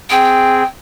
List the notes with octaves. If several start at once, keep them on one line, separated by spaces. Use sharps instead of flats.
C4 G#4 G5